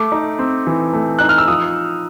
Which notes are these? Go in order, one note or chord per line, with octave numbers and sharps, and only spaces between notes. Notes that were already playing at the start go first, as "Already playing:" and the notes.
Already playing: A3 D6
D#4
C4
E3
A3
D#4 F#6
F6
E6
F3 D#6